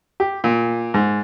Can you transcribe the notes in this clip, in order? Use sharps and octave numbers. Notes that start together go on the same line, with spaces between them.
G4
A#2
G#2